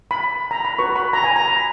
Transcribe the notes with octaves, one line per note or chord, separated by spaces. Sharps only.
B5
A#5
B5
F#4 B4 C#6
B5
A#5
G#5
A#5
B5